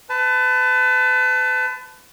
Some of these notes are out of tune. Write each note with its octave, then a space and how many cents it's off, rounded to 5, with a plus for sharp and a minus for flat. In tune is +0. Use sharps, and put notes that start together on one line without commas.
B4 +35 A5 +0